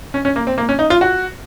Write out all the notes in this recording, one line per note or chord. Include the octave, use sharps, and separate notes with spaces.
C#4
C#4
A#3
C4
A#3
C#4
D#4
F4
F#4